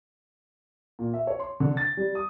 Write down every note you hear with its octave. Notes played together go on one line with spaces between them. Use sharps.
A#2
E5
C#5
C6
D3
A6
G3
D#6